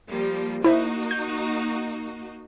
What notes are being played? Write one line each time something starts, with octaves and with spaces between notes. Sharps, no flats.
F3 G3 A#3
A#3 D#4 E4 F#4 C5 E5
G6